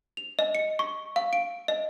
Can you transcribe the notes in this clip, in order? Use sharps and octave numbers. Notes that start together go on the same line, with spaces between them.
F7
D#5
C#7
C#6
F5
D7
D#5